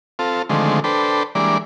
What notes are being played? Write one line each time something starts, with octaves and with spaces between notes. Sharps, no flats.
C4 F4 A4
D3 D#3 F3 G#3 A3 C4
D4 A4 B4 C5 G5
E3 G3 G#3 A#3 D4 D5